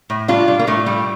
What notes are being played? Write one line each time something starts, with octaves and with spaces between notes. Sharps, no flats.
A2
G3 D4 F4
G3
A#3
A2 A3
G3